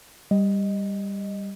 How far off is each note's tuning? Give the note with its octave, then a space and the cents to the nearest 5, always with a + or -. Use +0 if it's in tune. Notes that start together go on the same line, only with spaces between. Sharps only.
G3 +15 D#5 +0